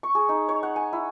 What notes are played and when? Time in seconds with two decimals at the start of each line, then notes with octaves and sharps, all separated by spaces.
0.03 C#6
0.15 G#4
0.29 D#4
0.49 C#5
0.63 F#5
0.76 G#5
0.93 E4